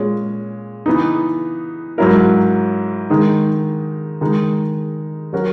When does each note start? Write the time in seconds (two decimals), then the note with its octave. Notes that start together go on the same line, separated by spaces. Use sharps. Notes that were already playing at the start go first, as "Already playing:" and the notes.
Already playing: A#2 G#3 C#4
0.86 E3 B3 D#4
1.98 G#2 F#3 C#4 E4 A#4
3.10 D#3 G#3 D#4
4.21 D#3 G#3 D#4
5.33 F#3 C#4 F#4 A#4